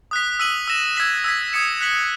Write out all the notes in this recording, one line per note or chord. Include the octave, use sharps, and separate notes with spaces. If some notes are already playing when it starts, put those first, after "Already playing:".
D#6 F#6 B6
E6 B6 D#7 F#7
E6 A#6 E7
E6 G#6 B6 F#7
E6 G#6 B6
D#6 G#6 C#7 E7
F#6 B6 F#7